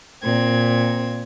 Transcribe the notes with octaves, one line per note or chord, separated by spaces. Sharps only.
A#2 C4 G#6